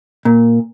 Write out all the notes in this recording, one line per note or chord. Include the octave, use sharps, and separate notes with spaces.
A#2